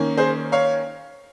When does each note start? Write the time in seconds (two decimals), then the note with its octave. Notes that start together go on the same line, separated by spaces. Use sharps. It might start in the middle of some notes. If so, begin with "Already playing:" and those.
Already playing: D#3 A#3 C#4
0.17 G#4 C5
0.52 C#5 F5